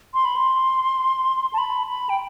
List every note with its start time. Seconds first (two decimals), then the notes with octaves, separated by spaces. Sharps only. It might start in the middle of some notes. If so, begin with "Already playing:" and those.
0.14 C6
0.25 B5
0.36 C6
1.53 A5
1.58 B5
1.87 B5
2.09 G5